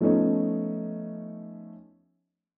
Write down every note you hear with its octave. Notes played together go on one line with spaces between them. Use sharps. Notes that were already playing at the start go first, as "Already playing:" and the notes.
F3 A3 B3 C#4 D#4